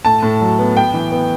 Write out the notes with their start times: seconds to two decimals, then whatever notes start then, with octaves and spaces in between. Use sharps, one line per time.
0.05 A2 A5
0.23 A2
0.41 F#3
0.59 B3
0.76 B3 G5
0.94 E3
1.12 B3